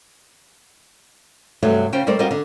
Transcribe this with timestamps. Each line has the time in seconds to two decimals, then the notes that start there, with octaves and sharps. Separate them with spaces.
1.63 G2 C3 F#3 A3
1.92 C#3 C#4 F4 C5 G5
2.07 G3 A3 A#4 C5 D5
2.19 G3 C4 F4 F#4 A#4 D#5
2.31 D3